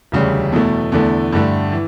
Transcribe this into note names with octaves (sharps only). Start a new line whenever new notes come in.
E1 D2 C#3 G3
E2 B2 A3
E2 D3 A3
G2 D3 A3
E3